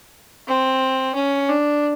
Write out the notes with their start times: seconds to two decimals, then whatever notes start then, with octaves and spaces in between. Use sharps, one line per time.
0.48 C4
1.15 C#4
1.48 D4